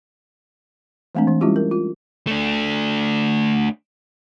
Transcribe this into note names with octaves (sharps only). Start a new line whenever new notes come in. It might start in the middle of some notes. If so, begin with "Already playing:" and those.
E3 G#3 A3 C4 D4
E3
G3 G#3 C#4 E4 F4 G4
A#4
F4
A3 D4